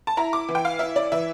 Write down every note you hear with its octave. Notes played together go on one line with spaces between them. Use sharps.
A5
E4 A#5
D6
E3
G5
F5
E4 E5
D5
E3 E5